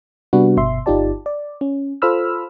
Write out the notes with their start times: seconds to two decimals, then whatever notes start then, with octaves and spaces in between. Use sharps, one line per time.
0.33 C3 G3 B3 D4 F#4 B4
0.57 G1 B2 E5 C6
0.86 G1 D#4 F4 G4 D5 A5
1.26 D5
1.61 C#4
2.02 F4 A4 C5 B5 E6 F6